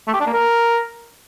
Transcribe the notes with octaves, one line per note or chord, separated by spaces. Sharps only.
A3
G4
D4
A#3
A#4